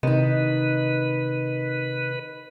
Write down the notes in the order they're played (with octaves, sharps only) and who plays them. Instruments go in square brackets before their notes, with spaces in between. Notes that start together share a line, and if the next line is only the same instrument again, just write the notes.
[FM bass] C3 [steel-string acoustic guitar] D#3 D#4 [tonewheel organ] B4 [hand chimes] D#5